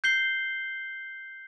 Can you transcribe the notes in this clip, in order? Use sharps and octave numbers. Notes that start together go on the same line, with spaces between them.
G6 C7 G7